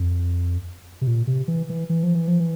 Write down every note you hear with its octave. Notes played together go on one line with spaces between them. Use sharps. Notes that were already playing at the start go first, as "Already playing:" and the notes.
Already playing: F2
C3
A#2
C3
E3
E3
E3
F3
E3
F3
E3